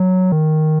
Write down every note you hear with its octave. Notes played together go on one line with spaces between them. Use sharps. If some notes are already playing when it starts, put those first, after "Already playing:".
Already playing: F#3
D#3